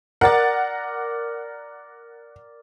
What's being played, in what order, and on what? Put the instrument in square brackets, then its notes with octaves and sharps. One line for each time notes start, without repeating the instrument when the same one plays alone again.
[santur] A#4 D5 [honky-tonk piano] F#5 A6